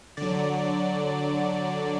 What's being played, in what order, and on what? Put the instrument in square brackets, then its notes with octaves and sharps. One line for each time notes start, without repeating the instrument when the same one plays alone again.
[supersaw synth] D3 F#3 D5